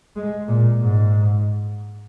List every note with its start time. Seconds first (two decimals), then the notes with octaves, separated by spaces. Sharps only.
0.16 G#3
0.48 A#2
0.82 G#2